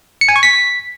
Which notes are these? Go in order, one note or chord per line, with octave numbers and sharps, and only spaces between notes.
C#7
G#5
C#6
B6